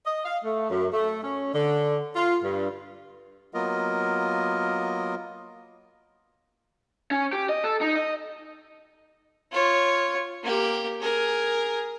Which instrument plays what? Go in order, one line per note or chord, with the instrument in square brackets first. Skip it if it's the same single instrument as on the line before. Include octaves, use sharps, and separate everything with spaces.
[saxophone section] D#5
F5
A3
F#2
A3
C#4
D3
F4
G2
[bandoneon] F#3 A#3 B3 F4 A#4 D#5
[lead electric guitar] C#4
G4
D#5
A4
D#4
D#5
[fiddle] F4 C#5
A#3 G4
G#4 A#4